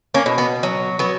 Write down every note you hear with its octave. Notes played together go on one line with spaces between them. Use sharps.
A#3 C#4
B2
B3
F#3
F#3 B3